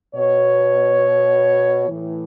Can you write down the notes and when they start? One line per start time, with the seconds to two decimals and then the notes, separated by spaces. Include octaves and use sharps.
0.15 B2 C#5
1.87 A2 E3